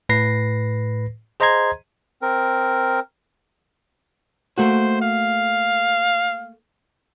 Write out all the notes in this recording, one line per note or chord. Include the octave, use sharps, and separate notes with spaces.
A2 B4 A#6 C7
G#4 C5 D#5 A#5 C6 G#6
C4 A#4
A3 A#3 F#4 C5
F5